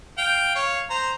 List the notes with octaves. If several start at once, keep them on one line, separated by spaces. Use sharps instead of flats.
F5 G5
C#5 F5
C5 A#5